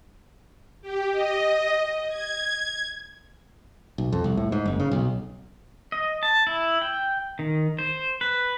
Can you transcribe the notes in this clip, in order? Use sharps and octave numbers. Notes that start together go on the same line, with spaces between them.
G4
D#5
G#6
B1
F2
C2
A2
G#2
F#1
C#3
B1
D#5
A5
E4
G5
D#3
C5
B4